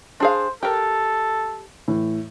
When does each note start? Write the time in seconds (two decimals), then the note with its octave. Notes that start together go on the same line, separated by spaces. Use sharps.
0.20 D4 G#4 C5 F5
0.63 G4 A4 A#4
1.88 A2 E3